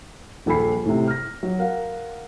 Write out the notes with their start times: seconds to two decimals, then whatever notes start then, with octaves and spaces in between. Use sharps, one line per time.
0.46 D#1 A#1 A4 G#5 B5 C7
0.85 A2 C3
1.07 F6 A#6
1.43 F#3
1.59 A#4 F5 F#5